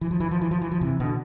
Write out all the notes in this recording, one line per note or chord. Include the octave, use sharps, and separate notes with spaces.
E3
F3
E3
F3
E3
F3
E3
F3
C3 E3
B2 D3